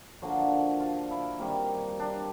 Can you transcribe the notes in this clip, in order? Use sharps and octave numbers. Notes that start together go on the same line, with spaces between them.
D3 F3 A#3 D4 F#4
F4
E4
C3 D#3 G3 A#3
D4